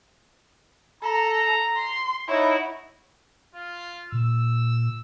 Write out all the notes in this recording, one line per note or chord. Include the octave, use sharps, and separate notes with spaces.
A4 A#5
C6
D#4 E4 C#5 F#5
F4
A#2 E6